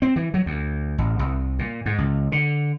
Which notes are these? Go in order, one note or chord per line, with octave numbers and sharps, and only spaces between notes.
C4
E3
F#3
D2
A1
C2
A#2
G#2
C#2
D3